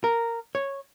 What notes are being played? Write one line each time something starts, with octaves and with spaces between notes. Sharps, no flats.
A#4
C#5